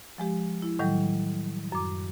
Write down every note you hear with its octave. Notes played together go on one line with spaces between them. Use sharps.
F3 G#3 G4
E4
A2 D#3 F#3 G3
F#2 D6